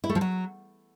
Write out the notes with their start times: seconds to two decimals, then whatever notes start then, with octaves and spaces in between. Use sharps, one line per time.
0.04 E4
0.09 A3
0.15 F3
0.21 F#3